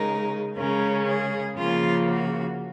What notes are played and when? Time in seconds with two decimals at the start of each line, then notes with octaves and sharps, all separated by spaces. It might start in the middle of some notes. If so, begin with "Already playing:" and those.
Already playing: C#3 G#3 D#4 A#4
0.58 C#3 G#3 C#4 A#4
1.08 G#4
1.57 C#3 F3 A#3 F4
2.08 F#4